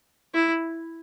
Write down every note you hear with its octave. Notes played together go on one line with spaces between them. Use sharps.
E4